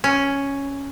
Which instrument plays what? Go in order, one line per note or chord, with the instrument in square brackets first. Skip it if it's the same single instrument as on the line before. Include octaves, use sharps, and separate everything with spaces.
[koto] C#4